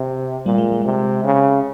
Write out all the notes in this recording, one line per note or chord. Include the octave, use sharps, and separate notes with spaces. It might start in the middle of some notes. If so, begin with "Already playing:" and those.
Already playing: C3
A#2 G3 A#3
G#3
G#3
C3
C#3